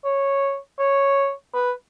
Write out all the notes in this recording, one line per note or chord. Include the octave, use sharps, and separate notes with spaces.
C#5
C#5
B4